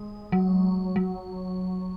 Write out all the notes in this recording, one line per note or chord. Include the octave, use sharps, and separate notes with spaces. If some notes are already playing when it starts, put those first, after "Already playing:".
Already playing: G#3
F#3
F#3